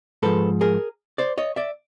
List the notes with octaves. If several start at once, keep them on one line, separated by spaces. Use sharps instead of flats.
G#2 F3 A4 B4
G#4 A#4
C5 D5
C#5 D#5
D5 E5